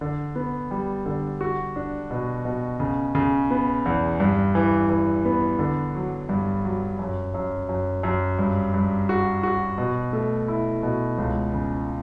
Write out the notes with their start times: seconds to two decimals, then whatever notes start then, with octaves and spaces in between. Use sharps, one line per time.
0.01 D3
0.36 B3
0.71 G3
1.06 D3
1.41 F#4
1.76 D4
2.11 B2
2.45 B2
2.80 C#3
3.15 C#3
3.51 B3
3.86 E2
4.20 G2
4.55 E3
4.90 E3
5.25 B3
5.59 D3
5.95 F#3
6.29 G2
6.64 F#3
6.99 F#2
7.34 F#2
7.69 F#2
8.03 F#2
8.39 G2
8.74 G2
9.09 F#4
9.43 F#4
9.78 B2
10.13 A3
10.48 E4
10.83 B2
11.18 C#2
11.53 C#3